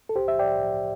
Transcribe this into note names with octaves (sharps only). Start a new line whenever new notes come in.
A4
C2 G4 C5
E5
D5 G5